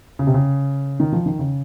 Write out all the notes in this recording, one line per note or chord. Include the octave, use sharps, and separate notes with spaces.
C#3
C3
C#3
D#3
F3
D#3
C#3